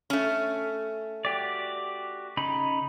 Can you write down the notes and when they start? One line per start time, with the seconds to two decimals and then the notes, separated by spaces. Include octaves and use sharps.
0.10 A3 C#4
1.25 F#4 G4 D5
2.37 C#3 D#4 B5